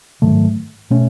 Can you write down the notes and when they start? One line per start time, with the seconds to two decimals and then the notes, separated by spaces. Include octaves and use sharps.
0.22 G#2 D#3 F#3 A3
0.90 B2 A3 C#4